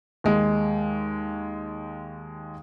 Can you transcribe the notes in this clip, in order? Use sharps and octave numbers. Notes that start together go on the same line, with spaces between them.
D#2 G#3